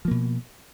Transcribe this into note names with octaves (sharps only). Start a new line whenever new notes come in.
B2 F3 A#3